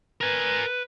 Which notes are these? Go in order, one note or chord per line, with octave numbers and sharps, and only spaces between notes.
A#4 B4 G#5